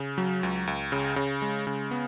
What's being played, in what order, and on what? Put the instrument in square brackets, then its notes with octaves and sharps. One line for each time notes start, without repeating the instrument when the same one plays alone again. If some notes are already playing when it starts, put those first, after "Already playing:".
Already playing: [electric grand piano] C#3
F#3
C#2
C#2
C#3
C#3
G#3
C#3
B3